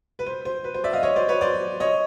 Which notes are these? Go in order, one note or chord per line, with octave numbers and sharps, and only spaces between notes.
B4
C5
C5
B4
C5
D5 E5
D#5 F5
C#5 D#5
C5 D5
B4 C#5
C5 D5
C#5 D#5